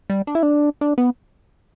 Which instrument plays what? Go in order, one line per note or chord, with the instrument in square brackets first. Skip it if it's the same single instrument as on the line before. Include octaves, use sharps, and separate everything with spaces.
[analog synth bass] G3
D4
E4
D4
D4
B3